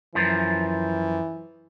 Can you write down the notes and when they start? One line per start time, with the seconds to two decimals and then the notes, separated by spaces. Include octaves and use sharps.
0.15 F#2 E3 F3